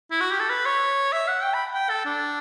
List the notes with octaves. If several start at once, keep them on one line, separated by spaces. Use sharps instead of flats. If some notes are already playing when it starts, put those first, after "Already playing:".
E4
F#4
G4
A4
B4
C#5
E5
F#5
G5
B5
G5
A4
D4